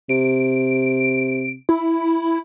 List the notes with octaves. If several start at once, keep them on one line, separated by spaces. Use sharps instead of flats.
C3 D7
E4